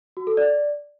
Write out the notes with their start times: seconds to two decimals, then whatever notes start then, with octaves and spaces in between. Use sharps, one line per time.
0.17 F#4
0.27 A4
0.37 D5